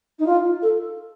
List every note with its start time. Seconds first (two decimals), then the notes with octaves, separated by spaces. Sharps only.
0.19 D#4
0.26 F4
0.62 A4